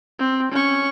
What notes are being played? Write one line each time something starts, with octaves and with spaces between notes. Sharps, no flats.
C4
C#4 C#6